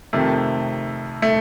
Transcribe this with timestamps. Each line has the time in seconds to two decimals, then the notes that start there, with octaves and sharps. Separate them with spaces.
0.13 F2 C3 D#3 A3
1.22 A3